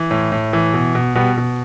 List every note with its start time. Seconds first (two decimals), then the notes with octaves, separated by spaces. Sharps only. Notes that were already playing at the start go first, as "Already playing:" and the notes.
Already playing: E3
0.11 A2
0.32 A2
0.53 E3
0.74 B2
0.95 B2
1.15 B2 G3 B3
1.37 B2